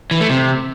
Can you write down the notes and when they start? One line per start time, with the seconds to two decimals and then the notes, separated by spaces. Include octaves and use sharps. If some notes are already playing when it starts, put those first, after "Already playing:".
0.11 E3
0.20 A3
0.30 C3